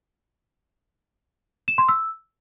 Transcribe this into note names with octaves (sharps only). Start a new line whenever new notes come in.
E7
C6
E6